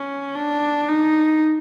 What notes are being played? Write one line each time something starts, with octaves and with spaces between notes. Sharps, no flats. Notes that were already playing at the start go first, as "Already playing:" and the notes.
Already playing: C#4
D4
D#4